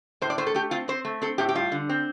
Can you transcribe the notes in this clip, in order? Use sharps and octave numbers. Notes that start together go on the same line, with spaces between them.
A2 C5
D5
A3 C5
A4
A3 G4
C4 F4
C4 C5
A3
C4 A4
A2 G4
G4
G3 F4
D3
C4